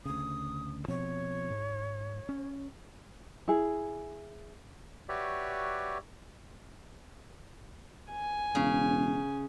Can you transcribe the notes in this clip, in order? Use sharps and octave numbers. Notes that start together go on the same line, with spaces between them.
D2 C#3 D#6
B2 F3 C4 C#5
G#2
C#4
E4 G#4
F#4 G4 B4 C#5 D5 E5
G#5
E1 C#3